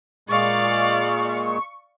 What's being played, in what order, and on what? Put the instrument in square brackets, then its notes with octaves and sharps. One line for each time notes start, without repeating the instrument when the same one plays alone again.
[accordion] A#2 G#3 [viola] D5 F5 [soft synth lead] C#6